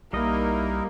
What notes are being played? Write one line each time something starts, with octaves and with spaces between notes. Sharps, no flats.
B1 G3 A#3 D#4 E4 A#4 D#5